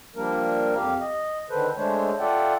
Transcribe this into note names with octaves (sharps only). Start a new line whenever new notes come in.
F3 G3 A#3 D4 A#4
F2 G4 F5
D#5
D3 D#3 A4 B4 C5
G#3 A3 D4 C5 C#5
F4 A4 D5 E5 F#5 G5